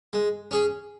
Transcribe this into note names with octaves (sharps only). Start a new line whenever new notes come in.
G#3
C#4 G#4